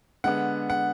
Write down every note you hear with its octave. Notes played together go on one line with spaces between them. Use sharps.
D3 G#3 B3 F#5
F#5